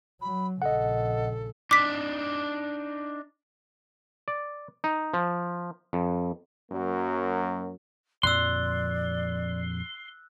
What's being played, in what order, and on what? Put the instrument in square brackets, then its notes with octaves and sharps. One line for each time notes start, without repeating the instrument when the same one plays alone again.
[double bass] F#3 [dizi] B5
[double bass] A#1 C#3 [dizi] A4 [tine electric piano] D#5 F#5
[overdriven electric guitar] D4 D#4 [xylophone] D6 B6
[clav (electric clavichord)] D5
D#4
F3
F2
[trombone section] F#2 F#3 A#3
[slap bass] F2 A#2 F3 [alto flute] D5 [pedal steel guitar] C6 [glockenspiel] E6 F#6